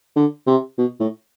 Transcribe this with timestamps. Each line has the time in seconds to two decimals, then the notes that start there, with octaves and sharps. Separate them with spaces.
0.16 D3
0.47 C3
0.78 B2
1.00 A2